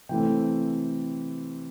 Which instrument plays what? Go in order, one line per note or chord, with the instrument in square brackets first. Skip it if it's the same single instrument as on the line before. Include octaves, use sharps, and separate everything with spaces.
[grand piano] C3 E3 A3 C4 G5